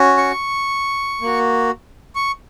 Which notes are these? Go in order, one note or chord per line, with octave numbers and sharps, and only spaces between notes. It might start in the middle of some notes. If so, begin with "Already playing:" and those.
Already playing: C#4 F#4
C#6
A#3 F#4
C#6